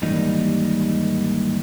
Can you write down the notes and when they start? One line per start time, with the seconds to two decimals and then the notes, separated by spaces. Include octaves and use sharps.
0.02 D#2 G#2 E3 G3 A#3 D#4